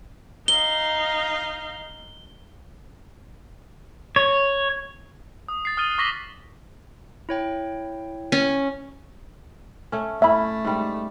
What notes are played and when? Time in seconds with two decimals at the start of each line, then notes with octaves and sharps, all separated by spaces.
0.48 D#4 F5 G7
4.16 C#5
5.48 D#6
5.65 A6 C7
5.77 D#6 F6 F#6 A6 D#7 G7
5.98 C#6 D6 A#6 B6 F#7 G7
7.29 E4 C#5 G5
8.32 C#4
9.92 A3 C#4
10.22 A3 C#4 E4 E5 B5
10.65 G#2 G3